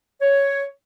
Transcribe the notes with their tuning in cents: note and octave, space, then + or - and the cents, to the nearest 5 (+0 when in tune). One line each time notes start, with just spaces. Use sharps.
C#5 +5